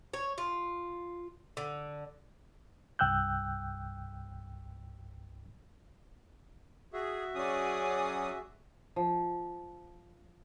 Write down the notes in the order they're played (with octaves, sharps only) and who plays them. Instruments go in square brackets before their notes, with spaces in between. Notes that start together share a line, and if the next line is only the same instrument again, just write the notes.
[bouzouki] C#5
F4
D3
[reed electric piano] C2 G2 G5 E6 F#6 G6
[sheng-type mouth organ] F#4 E5 [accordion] G#4
[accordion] F#3 C#4 D#6 [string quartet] G#4 D5
[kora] F3